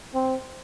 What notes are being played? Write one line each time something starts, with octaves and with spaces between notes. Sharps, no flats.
C4